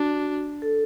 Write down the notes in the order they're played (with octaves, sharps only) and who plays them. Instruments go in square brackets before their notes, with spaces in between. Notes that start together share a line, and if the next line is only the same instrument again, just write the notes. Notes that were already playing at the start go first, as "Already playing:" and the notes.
Already playing: [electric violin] D4 [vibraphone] F#4
[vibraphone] A4